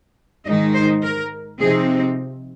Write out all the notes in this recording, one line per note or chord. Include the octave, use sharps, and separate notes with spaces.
G#2 D#3 G#3 D#4 D#5
C5
A#4
C3 F3 C4 D#4 G#4